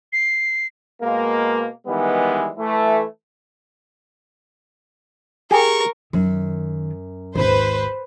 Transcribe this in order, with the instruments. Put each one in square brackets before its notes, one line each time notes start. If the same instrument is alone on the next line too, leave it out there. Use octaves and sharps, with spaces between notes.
[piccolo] C7
[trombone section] B2 G#3 A#3
D#3 E3 G3 G#3 B3
E3 A3
[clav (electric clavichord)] G4 G#4 [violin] A#4 C#6
[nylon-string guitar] F#2 [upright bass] D#3
[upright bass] G#1 D#2 [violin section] B4 C5